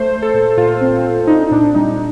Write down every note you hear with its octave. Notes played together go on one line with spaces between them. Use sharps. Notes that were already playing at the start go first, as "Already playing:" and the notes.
Already playing: A3 C5
A3
A4
A#2
A#2 F4
C4
C4
D4 D#4
A#2 D4
G3 D#4